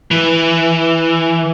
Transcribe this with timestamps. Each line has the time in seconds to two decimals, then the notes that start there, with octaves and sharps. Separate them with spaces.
0.11 E3